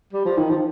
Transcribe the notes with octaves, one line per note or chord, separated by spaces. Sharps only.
G3
F3
D#3
F3